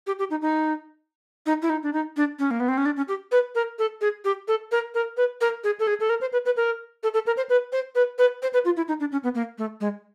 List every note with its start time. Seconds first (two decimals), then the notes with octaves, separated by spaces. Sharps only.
0.07 G4
0.19 G4
0.31 D#4
0.42 D#4
1.46 D#4
1.62 E4
1.70 D#4
1.83 D4
1.93 D#4
2.17 D4
2.39 C#4
2.51 A#3
2.60 B3
2.68 C4
2.78 C#4
2.86 D4
2.97 C#4
3.08 G4
3.32 B4
3.55 A#4
3.79 A4
4.01 G#4
4.25 G4
4.48 A4
4.72 A#4
4.95 A#4
5.17 B4
5.41 A#4
5.64 G#4
5.80 A4
5.87 G#4
6.00 A4
6.09 A#4
6.21 C5
6.33 B4
6.45 B4
6.57 A#4
7.03 A4
7.14 A4
7.27 A#4
7.37 C5
7.49 B4
7.72 C5
7.95 B4
8.18 B4
8.42 C5
8.53 B4
8.65 F4
8.77 E4
8.88 D#4
9.00 D4
9.12 C#4
9.24 B3
9.35 A#3
9.58 A3
9.81 G#3